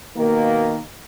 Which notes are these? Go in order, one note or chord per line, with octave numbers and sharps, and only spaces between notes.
B2 D#3 A#3